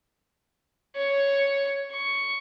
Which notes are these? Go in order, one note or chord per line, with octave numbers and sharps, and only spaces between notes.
C#5
C#6